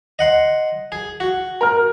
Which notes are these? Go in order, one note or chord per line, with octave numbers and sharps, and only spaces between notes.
D#5 F#5 C6
G#4
F#4
A#4 F6